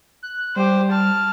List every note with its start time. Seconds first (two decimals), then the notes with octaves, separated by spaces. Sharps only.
0.23 F#6
0.56 G3 G4 C5
0.91 A5 F6